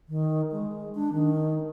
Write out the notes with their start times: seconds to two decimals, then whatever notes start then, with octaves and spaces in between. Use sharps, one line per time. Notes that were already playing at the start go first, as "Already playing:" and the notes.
0.09 D#3
0.52 G#3
0.95 D4
1.13 D#3